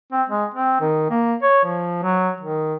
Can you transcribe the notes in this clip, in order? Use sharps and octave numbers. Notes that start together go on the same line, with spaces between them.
C4
G#3
C4
D#3
A#3
C#5
F3
F#3
D#3